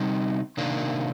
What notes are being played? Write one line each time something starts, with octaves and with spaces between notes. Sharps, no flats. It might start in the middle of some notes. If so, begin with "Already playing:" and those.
Already playing: C3 G3 C4 D#4
C3 D#3 A#3 D4